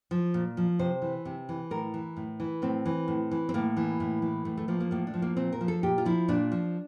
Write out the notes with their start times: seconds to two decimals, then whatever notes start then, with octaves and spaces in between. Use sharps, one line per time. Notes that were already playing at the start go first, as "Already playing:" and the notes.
0.11 F3
0.34 A#2
0.57 F3
0.79 C3 C5
1.02 E3
1.25 C3
1.49 E3
1.71 A2 A#4
1.94 E3
2.17 A2
2.40 E3
2.62 A2 C4
2.86 E3
3.08 A2
3.31 E3
3.49 C4
3.54 A2 A#3
3.77 E3
4.00 A2
4.22 E3
4.45 A2 A3
4.58 A3
4.68 F3 A#3
4.80 A#3
4.91 A2 A#3
5.07 D4
5.14 F3
5.22 A#3
5.37 A#2 C4
5.53 A#4
5.61 F3
5.68 A4
5.83 A#2 G4
5.98 F4
6.06 F3 E4
6.28 A#2 D4
6.52 F3